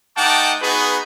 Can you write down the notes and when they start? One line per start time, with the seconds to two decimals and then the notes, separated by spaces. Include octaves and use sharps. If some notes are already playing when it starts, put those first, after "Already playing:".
0.17 A3 D#4 F#5 G5 A5 D6
0.62 B3 D#4 F#4 G#4 B4